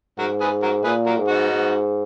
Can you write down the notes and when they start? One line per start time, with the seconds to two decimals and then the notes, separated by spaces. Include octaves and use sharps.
0.18 G#2 F#4 A#4
0.40 G#4 B4
0.62 F#4 A#4
0.84 A#2 G#4 B4
1.06 F#4 A#4
1.17 G#2
1.28 D#4 F#4
1.50 G#2